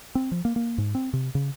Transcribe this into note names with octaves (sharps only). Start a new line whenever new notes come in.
C4
F3
A#3
A#3
G#2
C4
C3
C#3